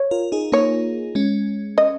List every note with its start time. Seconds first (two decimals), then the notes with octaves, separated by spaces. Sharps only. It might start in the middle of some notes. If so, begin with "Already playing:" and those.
Already playing: C#5
0.11 F4 A#4
0.32 D#4 G#4
0.52 A#3 D#4 C#5
1.15 G#3 C#4
1.78 D#5